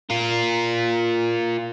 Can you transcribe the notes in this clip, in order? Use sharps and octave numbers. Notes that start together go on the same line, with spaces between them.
F4 A#4